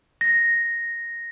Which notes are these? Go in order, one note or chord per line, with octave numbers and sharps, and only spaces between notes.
A#6